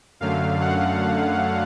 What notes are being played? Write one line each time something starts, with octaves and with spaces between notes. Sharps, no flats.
F#2 D3 F#3 A3 F5
F#5